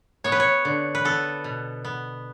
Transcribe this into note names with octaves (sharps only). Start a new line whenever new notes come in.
B3 C#5
B4
C#5
D3
B4
B3 A4
B2
B3